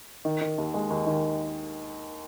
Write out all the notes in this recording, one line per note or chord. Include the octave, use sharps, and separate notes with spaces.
D#3
D#3
D#2
G#3
D#2
D#3